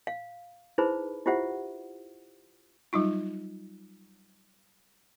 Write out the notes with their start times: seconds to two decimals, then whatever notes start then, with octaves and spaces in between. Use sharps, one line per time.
0.07 F5
0.78 D#4 E4 G#4 B4 C5 B5
1.26 E4 F4 G4 C5 E5 F#5
2.93 F#3 G3 D#4 F4